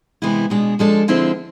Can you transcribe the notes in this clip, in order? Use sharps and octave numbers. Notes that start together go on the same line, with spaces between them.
C3 E3 G#3 B3 E4
B2 G#3 D4 G#4
F3 G#3 D4 A4
D3 F3 G#3 C4 E4